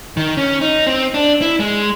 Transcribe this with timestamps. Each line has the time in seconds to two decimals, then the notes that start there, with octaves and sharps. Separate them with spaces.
0.17 D#3
0.37 C#4
0.61 D#4
0.87 C4
1.14 D4
1.42 E4
1.60 G#3